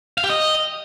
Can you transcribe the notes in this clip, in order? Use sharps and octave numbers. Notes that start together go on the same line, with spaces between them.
F5
G4
D#5